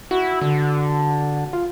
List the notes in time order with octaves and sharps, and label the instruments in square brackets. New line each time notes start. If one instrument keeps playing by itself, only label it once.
[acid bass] E4 [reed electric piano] F#4
[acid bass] D3
[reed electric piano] F4